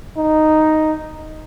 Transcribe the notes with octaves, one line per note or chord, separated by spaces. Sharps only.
D#4